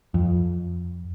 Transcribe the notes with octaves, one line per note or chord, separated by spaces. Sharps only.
F2